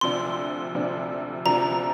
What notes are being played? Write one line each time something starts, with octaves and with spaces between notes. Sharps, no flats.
D2 C3 F3 D4 C6
D2 C3 F3 D4
D2 C3 F3 D4 A#5